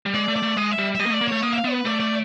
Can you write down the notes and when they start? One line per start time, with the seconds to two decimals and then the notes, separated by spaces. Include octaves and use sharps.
0.06 G3
0.14 G#3 D5
0.28 A3
0.36 D5
0.43 A3
0.57 G#3 D#5
0.71 E5
0.79 G3
0.95 E5
0.99 G3 D#5
1.06 A#3
1.10 A3
1.14 D5
1.21 A#3
1.28 A3 C#5
1.42 A#3 D#5
1.53 E5
1.57 F5
1.64 B3
1.71 B4
1.85 A3 D5
2.00 D5